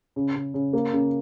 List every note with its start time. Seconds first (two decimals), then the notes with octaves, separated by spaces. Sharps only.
0.16 C#3
0.36 C#3
0.54 C#3
0.73 A#3
0.93 C#3